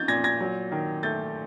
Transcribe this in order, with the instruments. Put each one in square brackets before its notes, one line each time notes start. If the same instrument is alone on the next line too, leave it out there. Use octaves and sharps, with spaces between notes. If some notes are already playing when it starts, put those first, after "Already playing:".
Already playing: [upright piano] F3 D#4 [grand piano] G6 A6
[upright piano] A#2 [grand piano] G#6 A#6
[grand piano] G#6 A#6
[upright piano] F#3
D#3
[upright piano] A3 [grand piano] G6 A6